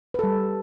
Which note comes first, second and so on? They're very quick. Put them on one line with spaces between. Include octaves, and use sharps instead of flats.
B4 A4 G3